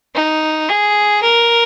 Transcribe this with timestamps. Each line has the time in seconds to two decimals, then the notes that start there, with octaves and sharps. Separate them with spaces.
0.15 D#4
0.69 G#4
1.23 A#4